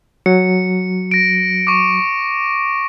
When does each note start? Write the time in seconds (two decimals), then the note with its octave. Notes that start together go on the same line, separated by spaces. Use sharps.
0.26 F#3 C#7
1.11 A#6 D7
1.67 C#6 D6